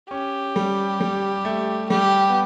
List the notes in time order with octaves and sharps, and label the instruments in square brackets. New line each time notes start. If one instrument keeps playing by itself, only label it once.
[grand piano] C#4 [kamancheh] G4
[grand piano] G3
G3
A3
[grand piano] G3 [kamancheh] G4
[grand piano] B3